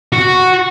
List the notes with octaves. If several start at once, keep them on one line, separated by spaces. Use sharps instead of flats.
F#4